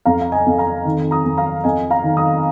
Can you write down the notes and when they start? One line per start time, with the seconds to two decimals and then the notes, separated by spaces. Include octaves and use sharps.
0.05 F2 F5 A#5
0.21 F5
0.32 D#5 G#5
0.46 F2
0.58 F5 A#5
0.85 D#3
1.11 A#5 D#6
1.25 F2
1.37 F5 A#5
1.64 F2 D#5 G#5
1.91 F5 A#5
2.03 D#3
2.17 A#5 D#6